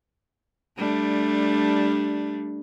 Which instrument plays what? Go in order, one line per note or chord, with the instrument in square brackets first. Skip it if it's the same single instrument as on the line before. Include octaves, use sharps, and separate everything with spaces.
[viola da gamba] G3 A3 D4